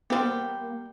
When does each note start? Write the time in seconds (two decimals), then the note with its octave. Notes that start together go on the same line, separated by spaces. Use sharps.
0.10 G3 A#3 B3 G4 C5